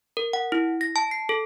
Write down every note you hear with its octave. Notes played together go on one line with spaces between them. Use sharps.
A#4
F#5
E4
A#6
A5
C7
A4